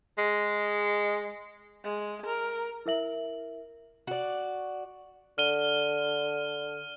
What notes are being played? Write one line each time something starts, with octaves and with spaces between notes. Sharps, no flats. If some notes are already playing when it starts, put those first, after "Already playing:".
G#3
G#3
A#4
E4 A#4 E5 F#7
F#4 D5
D3 F6 D#7 G7